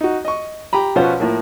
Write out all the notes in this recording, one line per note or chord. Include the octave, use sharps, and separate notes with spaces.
D#4 F#4
D#5 C#6
G4 G5 A#5 B5
B2 F3 C#4 B4 C5 F5
A2 F3 A#3